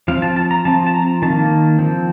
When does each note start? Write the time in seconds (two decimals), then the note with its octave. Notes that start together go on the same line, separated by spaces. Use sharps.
0.08 F3 C4 F5
0.22 A5
0.36 A5
0.51 A#5
0.65 F3 C4 A5
0.87 A5
0.94 A#5
1.22 D#3 A#3 A5
1.79 F3 C4